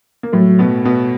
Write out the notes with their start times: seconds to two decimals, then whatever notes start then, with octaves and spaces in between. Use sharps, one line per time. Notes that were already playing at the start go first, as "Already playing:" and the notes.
0.23 A#3
0.33 A2 F#3 A3
0.59 B2 B3
0.85 B2 B3